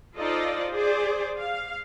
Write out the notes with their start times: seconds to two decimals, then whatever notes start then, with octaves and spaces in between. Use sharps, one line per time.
0.17 D#4 F4 A4 C5 D5 D#5
0.72 G#4 C5 D5
1.37 F5